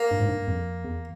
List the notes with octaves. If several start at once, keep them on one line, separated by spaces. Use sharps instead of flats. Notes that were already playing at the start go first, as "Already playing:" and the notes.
Already playing: A#3
G2
G#2
G2
F2
E2